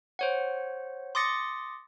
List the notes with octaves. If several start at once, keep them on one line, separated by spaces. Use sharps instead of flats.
C5 C#5 F#5
C6 D6 D#6 A6 A#6 C#7